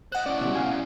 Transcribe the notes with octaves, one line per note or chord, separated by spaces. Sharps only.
C5 D#5 F#5 F#6
C#4 E4 D5
B2 G3
F5 G#5